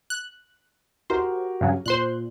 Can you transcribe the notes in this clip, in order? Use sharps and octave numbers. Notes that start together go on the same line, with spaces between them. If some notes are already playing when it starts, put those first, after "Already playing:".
F#6
F#4 G4 A#4 C5
G2 C#3 F#3
A#2 C5 C6 F#6